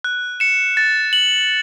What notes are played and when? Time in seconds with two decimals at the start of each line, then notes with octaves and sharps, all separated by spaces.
0.04 F#6
0.40 C#7 E7
0.77 A6
1.13 F#7